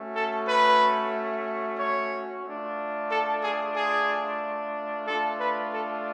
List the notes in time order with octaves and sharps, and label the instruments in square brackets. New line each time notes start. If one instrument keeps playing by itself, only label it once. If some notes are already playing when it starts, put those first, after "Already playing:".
Already playing: [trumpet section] A3 C#4 F#4
A4
B4
C#5
A3 D4 F4
A4
G#4
G#4
A3 D4 F4 A4
B4
A4